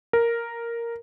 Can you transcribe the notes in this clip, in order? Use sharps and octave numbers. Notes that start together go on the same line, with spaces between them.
A#4